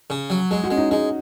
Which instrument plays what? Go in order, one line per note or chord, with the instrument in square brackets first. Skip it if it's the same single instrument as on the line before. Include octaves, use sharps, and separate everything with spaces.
[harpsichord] C#3
F#3
[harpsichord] G#3 [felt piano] G#4
[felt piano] F#4
[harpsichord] G#3 [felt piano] C#4
[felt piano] D#4
[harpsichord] G#3 [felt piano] D#4